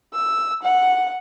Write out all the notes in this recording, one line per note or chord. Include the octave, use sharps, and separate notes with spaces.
E6
F#5